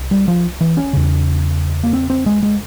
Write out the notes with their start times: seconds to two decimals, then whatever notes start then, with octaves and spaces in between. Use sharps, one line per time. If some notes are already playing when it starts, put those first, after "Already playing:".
Already playing: C2
0.11 G3
0.28 F3
0.61 E3
0.77 C#4
0.93 E2 C#3
1.83 A#3
1.93 C4
2.10 C4
2.26 G#3
2.43 G#3